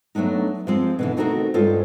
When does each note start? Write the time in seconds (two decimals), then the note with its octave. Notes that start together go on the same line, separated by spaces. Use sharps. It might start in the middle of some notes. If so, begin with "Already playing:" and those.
0.15 F#3 A3 B3 D4 D#4
0.67 F3 G#3 C4
0.99 B2 D3 E3
1.17 A3 C4 D#4 F#4 A4 A#4
1.54 G2 G#3 C#4 F4 A4 C5